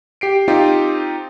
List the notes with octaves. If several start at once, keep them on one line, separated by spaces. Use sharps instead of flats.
G4 C7 D7
C4 D#4 F4 G4